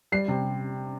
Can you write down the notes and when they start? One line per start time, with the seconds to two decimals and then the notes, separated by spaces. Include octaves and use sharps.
0.12 G3 C7
0.28 C3